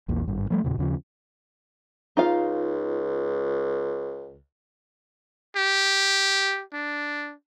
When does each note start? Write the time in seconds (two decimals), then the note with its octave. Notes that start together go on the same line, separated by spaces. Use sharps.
0.08 A#1 E2 A#2
0.28 G#1 G2
0.50 F3 G3 A3
0.64 E2 A#2 C#3
0.78 D#2 C#3 F3
2.17 C#2 D#4 F4 F5
5.57 G4
6.73 D4